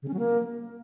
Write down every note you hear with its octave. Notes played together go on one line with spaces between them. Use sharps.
C#3
C#4
F#3
A#3